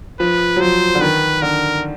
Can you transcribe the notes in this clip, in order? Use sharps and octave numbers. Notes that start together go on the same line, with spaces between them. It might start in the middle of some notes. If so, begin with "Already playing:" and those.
F3 B4
F#3
F3 C5
D3
D#3 B4
D3 A#4